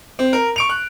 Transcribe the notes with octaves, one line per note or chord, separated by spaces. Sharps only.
C4
A#4
C#6 D7 F7
F#6